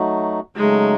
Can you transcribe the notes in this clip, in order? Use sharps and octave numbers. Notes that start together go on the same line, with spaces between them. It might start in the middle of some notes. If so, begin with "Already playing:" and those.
Already playing: F#3 A3 D#4 F#4
C#3 F#3 G#3 A3 D#4